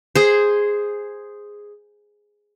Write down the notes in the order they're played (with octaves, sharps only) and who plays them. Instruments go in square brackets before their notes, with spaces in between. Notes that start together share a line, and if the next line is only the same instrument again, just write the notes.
[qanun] G#4 C5